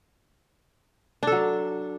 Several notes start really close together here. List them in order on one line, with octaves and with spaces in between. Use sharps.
D4 A4 F#3